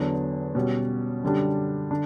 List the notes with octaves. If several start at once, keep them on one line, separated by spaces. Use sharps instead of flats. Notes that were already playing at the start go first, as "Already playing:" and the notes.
Already playing: E2 D3 F#3 B3 D4
B2 G3 C#4 F#4
F#2 D3 G3 D4
D3 D4